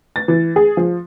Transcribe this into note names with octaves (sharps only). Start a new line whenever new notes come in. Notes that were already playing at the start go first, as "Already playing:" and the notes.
A6
E3
G#4
F3